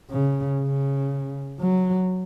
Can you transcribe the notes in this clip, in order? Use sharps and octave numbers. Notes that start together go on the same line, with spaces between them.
C#3
C#3
F#3